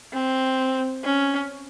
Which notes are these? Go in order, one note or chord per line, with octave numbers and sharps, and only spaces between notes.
C4
C#4